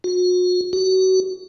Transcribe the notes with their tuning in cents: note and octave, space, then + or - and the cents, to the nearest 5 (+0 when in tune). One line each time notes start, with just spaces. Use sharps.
F#4 -40
F#4 +30